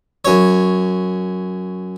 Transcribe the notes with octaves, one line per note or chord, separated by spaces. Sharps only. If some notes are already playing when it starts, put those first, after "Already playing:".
F#2 C#5